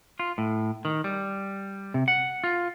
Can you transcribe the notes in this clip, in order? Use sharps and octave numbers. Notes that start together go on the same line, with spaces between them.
F4
A2
D#3
G3
C3
F#5
F4